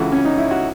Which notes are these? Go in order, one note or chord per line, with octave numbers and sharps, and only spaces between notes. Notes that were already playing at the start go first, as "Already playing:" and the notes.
Already playing: C#2 C#3 E3 F#4 A4
C#4
D#4
E4
F#4